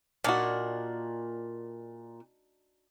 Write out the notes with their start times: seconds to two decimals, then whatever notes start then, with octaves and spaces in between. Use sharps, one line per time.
0.24 A#2 D4 D#4 F#4